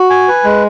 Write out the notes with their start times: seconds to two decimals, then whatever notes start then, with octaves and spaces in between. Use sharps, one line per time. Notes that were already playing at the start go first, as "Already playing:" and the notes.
Already playing: F#4
0.10 G#5
0.28 B4
0.44 G#3